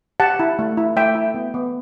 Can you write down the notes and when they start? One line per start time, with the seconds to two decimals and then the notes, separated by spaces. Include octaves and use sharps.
0.20 G4 F#5 A5
0.40 E4
0.59 A3
0.77 E4
0.96 A3 E5 G5
1.15 E4
1.34 B3
1.54 B3